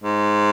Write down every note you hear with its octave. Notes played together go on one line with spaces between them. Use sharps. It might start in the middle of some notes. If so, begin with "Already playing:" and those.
G#2